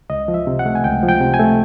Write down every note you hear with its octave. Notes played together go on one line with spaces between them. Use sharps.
C#2 D#5
F3
E5
C3
F#5
A3
G#5
C#2 G5
F3
G5
C3
G#5
A3